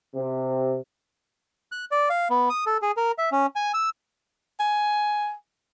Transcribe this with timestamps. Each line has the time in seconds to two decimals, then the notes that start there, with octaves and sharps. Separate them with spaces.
0.15 C3
1.72 F#6
1.91 D5
2.10 F5
2.30 B3
2.50 D#6
2.66 A4
2.82 G#4
2.97 A#4
3.18 E5
3.32 C#4
3.56 G#5
3.74 E6
4.60 G#5